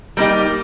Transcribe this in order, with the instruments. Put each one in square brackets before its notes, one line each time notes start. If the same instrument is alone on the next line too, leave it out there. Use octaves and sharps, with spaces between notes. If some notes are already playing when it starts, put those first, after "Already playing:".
[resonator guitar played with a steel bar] G3 A#3 D#4 G4